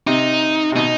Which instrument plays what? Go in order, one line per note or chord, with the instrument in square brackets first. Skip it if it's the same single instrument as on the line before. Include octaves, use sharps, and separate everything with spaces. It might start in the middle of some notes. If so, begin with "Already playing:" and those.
[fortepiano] C3 [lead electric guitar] D#4
[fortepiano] C3
[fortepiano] B2 [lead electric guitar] D#4